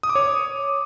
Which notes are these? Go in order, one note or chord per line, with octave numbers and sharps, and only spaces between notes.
D#6
D6
C#5